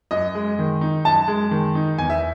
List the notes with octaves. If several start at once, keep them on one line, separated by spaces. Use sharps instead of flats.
F#2 D#5
G#3
D#3
D#4
F#2 A5
G#3
D#3
D#4
E2 G#5
E5